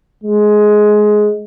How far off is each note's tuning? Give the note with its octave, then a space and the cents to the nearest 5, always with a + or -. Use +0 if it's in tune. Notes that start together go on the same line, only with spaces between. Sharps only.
G#3 +15